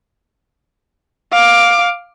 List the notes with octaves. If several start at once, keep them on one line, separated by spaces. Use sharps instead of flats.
F5 D6